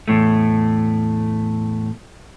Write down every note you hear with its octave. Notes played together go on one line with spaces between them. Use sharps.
E2 A2 A3